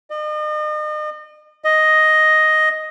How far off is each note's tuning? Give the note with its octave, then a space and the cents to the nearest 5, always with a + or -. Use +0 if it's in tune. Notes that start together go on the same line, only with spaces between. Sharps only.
D#5 -40
D#5 +5